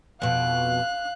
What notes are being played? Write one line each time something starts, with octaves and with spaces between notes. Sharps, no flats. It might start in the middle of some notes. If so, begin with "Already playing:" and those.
F2 B2 F5 F#6